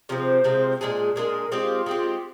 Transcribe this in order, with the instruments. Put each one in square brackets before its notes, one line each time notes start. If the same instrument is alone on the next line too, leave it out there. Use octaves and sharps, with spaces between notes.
[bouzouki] C3 F3 G#3 C4 [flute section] C5
[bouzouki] C3 F3 G#3 C4
A#2 G#3 D4 G#4
[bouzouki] A#2 G#3 D4 G#4 [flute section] A#4
[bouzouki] G#3 C4 G4 [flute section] F4
[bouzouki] G#3 C4 G4